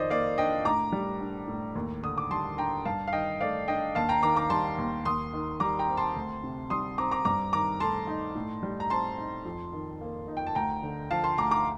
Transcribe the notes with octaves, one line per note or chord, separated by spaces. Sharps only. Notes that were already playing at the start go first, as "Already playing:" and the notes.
Already playing: F2 D#3 C5 D5 D#5
A#3 D5 F5
D4 D#5 G5
A2 A#5 D6
G3
D4
A2
D#2
D3 D#6
D6
G3 A5 C6
D4 G5 A#5
G2 F5 A5
F5
D#3 D#5 G5
A3 D5 F5
D4 D#5 G5
D#2 F5 A5
G5 A#5
D#3 A#5 D6
A#5 D6
G3 A5 C6
D#2
D#2 C6 D#6
D#3
G3 A#5 D6
G5 A#5
C4
A5 C6
D2
C3
G3 C6 D#6
C4 A#5 D6
A#5 D6
G2 A#5 D6
D#3 A#5 D6
A3 A5 C6
D#4
A2
G3
A#5
C4 A5 C6
D#4
F2
D#3
A#3
D#4
G5
A5
D2 G5 A#5
D3
F3 F5 A5
A5 C6
D2 A#5 D6
A#5 D6